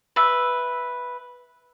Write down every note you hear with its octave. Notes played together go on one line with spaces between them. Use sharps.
B4 E5